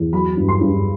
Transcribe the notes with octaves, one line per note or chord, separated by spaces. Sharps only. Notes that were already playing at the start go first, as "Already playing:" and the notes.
Already playing: E2
F#3 B5
G2
C6
G2